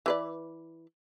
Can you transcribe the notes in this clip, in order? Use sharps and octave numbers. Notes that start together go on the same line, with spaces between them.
E3 B4 D5